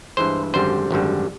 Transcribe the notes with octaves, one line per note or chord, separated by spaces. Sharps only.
G2 E3 G#3 C5
G#1 F#2 D3 G3 C5
G#1 F#2 D3 G3